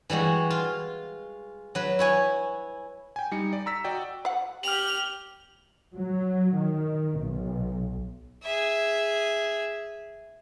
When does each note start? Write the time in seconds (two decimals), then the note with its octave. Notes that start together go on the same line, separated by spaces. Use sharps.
0.10 E3 G3 G#3 F#4
0.50 F4
1.75 F#3 B4
1.99 E4 C#5 G#5
3.16 G5 G#5
3.32 G3 D#4 C#7
3.53 D5
3.66 A#5 E6 B6
3.84 F#4 D5 D#5 G5
4.25 F5 F#5
4.63 G4 F6 F7 F#7
5.95 F#3
6.56 D#3
7.18 B1
8.43 G#4 E5